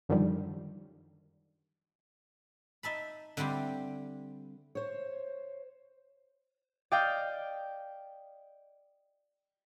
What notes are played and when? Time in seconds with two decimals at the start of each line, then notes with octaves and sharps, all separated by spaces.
0.09 F#2 D3 D#3 F3 G3
2.83 D#4 E5 A5 B5
3.37 D3 G3 C4 E4 G4
4.75 C5 C#5
6.92 D5 D#5 F5 G5